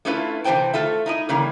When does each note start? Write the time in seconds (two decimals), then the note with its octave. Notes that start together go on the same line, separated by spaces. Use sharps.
0.05 A3 C#4 E4 F4 A4 B4
0.44 C3 E3 D4 C5 G5 A5
0.74 A3 F4 A4 E5
1.06 D#4 E4 D#5
1.29 C#3 E3 G3 A#3